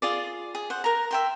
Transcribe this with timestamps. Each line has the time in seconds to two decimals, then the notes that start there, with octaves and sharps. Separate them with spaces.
0.02 F4 G#4 D5
0.55 G#4
0.70 C5 F#5
0.84 A#4 A#5
1.11 E5 G5 C6